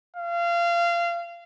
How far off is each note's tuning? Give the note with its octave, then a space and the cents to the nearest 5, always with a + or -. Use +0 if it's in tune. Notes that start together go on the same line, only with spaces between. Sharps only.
F5 -25